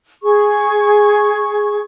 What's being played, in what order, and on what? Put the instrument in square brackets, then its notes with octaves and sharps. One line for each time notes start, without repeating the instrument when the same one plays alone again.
[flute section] G#4 C#6